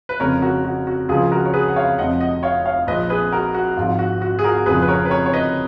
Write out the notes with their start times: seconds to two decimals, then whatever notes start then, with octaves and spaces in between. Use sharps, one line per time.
0.09 B4
0.20 F1 F2 C#3 F3 A#4 C#5
0.42 F#4 A#4
0.64 F#4
0.87 F#4
1.09 C#2 C#3 F3 F4 G#4
1.32 F#4 A#4
1.46 C#5
1.53 G#4 B4
1.68 F#5
1.76 C#5 F5
1.98 F1 F2 F3 D#5 F#5
2.21 D#5 F#5
2.43 C#5 F5
2.65 C#5 F5
2.87 A#1 A#2 F3 B4 D#5
3.10 G#4 B4
3.32 F#4 A#4
3.54 F#4
3.77 G#1 G#2 F3 F4
3.99 F#4
4.22 F#4
4.39 G#4
4.44 F#4 A#4
4.66 F1 F2 C#3 F3 G#4 B4
4.82 B4
4.88 A#4 C#5
5.05 B4
5.10 A#4 C#5
5.26 C#5
5.33 B4 D#5